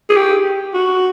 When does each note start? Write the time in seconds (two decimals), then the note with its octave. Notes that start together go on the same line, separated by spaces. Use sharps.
0.10 G#4
0.16 G4
0.74 F#4